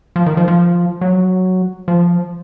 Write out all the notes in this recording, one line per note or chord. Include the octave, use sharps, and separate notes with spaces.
F3
D#3
F3
F3
F#3
F3